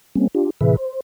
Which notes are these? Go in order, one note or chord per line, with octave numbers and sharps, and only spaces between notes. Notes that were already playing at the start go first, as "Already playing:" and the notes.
G3 A#3 C4 C#4
D4 F4 G4
A2 C3 E3 G#4 B4 E5
C5